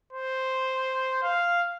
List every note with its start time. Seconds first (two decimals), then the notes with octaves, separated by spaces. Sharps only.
0.13 C5
1.23 F5